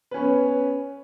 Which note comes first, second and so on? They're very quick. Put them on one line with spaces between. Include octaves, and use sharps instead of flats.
B4 C#4 B3